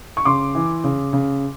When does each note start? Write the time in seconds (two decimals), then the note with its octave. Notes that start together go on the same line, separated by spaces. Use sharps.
0.17 C#6
0.25 C#3 C6 D6
0.55 E3
0.84 C#3
1.13 C#3